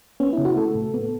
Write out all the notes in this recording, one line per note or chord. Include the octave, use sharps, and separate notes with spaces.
B3 C#4
E4
C#3
F#4
A3 A4
A2
B3